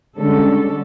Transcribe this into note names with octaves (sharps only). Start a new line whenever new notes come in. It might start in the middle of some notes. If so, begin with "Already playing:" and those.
D3 G3 G#3 C#4 D4 A4